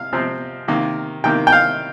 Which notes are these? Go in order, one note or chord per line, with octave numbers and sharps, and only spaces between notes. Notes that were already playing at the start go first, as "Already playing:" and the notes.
Already playing: C3 F5
C3 F3 C4
C3 D#3 A#3
C3 D#3 A#3 G5
G5
F5